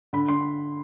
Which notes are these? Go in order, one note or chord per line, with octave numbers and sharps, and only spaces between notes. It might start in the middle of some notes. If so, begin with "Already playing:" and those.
D3 B5
D3 C6